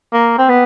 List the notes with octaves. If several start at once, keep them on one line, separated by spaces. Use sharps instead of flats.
A#3
C4
B3